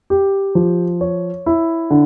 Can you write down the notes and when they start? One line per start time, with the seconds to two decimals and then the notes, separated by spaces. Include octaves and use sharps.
0.10 G4
0.55 F3
1.01 C#5
1.46 E4
1.91 D3